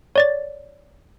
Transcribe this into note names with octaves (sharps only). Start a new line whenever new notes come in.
C#5 D5 A6